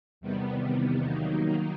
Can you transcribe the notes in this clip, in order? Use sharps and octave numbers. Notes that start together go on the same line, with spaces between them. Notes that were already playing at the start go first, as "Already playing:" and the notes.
E2 C3 D#3 G3 B3
D#3 F#3 A#3 D#4